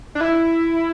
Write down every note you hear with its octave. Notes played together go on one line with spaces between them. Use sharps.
D4
E4